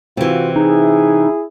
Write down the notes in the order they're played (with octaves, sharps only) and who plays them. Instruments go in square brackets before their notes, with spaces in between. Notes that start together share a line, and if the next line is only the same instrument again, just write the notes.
[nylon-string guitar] C3 E3 [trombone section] F4 F#4
[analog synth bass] D#4 [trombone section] E4 G#4